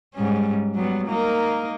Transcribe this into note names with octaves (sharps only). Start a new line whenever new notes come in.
G#2 G3 C#4
F#3 G3 B3
A#3 D#4 A#4